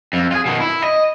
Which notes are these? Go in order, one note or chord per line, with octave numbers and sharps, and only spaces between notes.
F2
F4 G#4
B2 D#3
E4
D#5